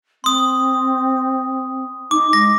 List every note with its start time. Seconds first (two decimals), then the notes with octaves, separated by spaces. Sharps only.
0.24 C4 C6 D#6
2.11 D#4 D6
2.33 G#3 A#6